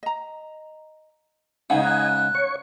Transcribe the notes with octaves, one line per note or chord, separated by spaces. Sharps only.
D#5 A#5
G#2 C#3 D#4 B4 D#5 F#5 G#5
F#5 A#5 F#6
C#5 C#6